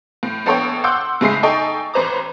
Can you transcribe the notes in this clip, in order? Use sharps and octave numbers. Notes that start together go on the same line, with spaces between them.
A2
A#1 B3 A4 C#5 G5
F#5 C6 D6 E6 G6
A2 C#3 G#3 E5 C7
D#4 A4 D#5 G5 G#5 C#6
A1 B4 C5 A#5 D6